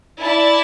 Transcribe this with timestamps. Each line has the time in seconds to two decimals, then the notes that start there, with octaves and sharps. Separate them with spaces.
0.21 E4 D5 A5